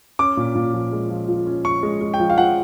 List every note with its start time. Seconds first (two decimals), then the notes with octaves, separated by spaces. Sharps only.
0.19 C#4 D6
0.37 A#2
0.55 A#2
0.74 F3
0.92 G#3
1.10 F3
1.28 F3
1.46 C#4
1.65 C#4 C#6
1.83 G#3
2.01 G#3
2.14 G5
2.20 F3
2.30 F5
2.38 F3 F#5